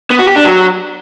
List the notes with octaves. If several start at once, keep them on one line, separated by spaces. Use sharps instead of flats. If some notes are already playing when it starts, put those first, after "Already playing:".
B3
F#4
G4
D4
F#3